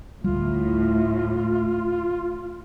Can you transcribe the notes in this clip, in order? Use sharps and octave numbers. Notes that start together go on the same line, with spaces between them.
D2 A2 G3 F4